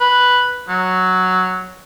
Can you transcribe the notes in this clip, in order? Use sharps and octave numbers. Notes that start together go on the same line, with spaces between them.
B4
F#3